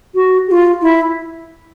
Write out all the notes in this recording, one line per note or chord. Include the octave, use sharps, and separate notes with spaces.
F#4
G4
F4
E4